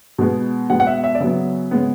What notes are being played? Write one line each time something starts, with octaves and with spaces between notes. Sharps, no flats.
B2 G#3 B3
B2 G#3 B3 F#5
F#5
E5
E5
D5
C#3 F#3 B3 E5
C#3 G#3 B3